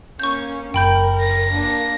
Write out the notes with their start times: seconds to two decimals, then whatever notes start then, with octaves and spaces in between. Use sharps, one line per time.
0.20 A#3 C#4 C#6 G6
0.74 F#1 A#4 G5 B5 G6
1.20 A#6
1.51 A#3 D4